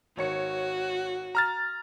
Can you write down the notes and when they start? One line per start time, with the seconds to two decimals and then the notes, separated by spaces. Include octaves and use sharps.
0.17 G#1 F#4 C#5 C#7
1.35 A#5 F6 A6